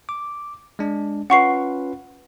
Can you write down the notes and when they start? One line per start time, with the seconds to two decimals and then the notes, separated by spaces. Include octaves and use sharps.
0.09 D6
0.79 G#3 D4
1.30 C#4 F4 B4 F#5 C#6 C7